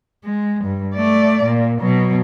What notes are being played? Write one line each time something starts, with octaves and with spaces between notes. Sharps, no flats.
G#3
G2
A3 D5
A#2
B2 F#3